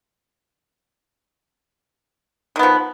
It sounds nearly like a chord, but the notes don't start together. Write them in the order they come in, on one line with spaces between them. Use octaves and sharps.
D#3 B3 F3